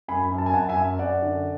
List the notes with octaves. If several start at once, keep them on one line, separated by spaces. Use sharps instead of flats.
F#2 G#5 B5
F#2
A5
G#5
F#2 F#5 A5
E5 G#5
F#2
F#2 D5 F#5
D3